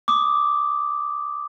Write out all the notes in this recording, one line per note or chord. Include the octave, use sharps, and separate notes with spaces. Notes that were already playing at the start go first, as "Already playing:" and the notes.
D6 D#6